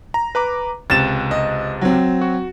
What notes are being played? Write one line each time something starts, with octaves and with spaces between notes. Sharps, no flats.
A#5
B4 A#5 D6
C#2 C3 A6 E7
D#5
F#3 C4
F#4